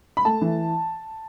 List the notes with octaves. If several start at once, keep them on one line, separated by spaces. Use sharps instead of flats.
B5
A3 A5
E3